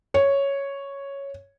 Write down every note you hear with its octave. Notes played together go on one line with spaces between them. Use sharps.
C#5